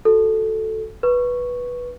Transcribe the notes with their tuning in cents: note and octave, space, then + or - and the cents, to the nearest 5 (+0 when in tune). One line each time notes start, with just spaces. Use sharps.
F#4 +0 A4 +0
B4 -10 C#6 +0